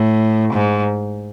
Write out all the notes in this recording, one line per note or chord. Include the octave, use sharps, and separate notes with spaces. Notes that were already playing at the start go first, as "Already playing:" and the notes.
Already playing: A2
G#2